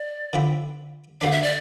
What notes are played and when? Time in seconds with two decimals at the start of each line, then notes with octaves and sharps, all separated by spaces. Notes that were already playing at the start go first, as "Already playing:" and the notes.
Already playing: D5
0.33 D3 F3 C4 E4
1.21 D2 D3 A3 D4 F5
1.31 E5
1.43 D5